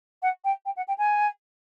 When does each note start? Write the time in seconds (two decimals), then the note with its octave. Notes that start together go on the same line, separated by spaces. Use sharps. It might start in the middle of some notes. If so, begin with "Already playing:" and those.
0.22 F#5
0.44 G5
0.65 G5
0.76 F#5
0.88 G5
0.98 G#5